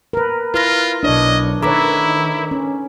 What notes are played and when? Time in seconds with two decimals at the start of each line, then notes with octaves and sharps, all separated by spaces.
0.13 A#4 B4
0.54 E4 F4 B4 F6 A#6
1.03 B1 D4 C#5 D#5
1.63 D#3 E4 A4 B4 C#5 A#5 D6 B6
2.51 C#4